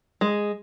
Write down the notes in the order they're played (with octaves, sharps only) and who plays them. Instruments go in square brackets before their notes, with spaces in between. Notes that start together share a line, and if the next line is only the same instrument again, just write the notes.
[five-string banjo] G#3